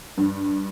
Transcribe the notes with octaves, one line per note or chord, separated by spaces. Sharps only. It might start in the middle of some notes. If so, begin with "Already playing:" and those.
G2